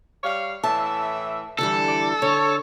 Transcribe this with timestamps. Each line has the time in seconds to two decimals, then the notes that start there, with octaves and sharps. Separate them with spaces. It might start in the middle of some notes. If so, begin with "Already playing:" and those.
0.24 G3 C#5 F5
0.64 A2 E3 E5 A5
1.59 D3 E3 G3 A4
1.88 D5
2.22 D3 C#5